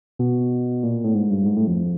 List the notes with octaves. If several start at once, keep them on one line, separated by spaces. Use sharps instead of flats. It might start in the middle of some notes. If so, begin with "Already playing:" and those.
B2
A#2
A2
G#2
G2
G#2
A2
F2